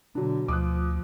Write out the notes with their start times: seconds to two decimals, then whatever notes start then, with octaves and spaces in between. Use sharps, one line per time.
0.15 B2 D3 F#3 D4
0.48 D2 F3 D6 D#6 F#6